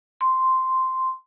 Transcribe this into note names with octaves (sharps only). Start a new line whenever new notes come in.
C6